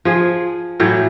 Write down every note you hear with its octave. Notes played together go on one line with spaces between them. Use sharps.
F3 G#4
A2 E3 F#3